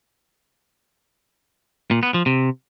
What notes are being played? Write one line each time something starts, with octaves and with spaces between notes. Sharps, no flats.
A#2
B3
F3
C3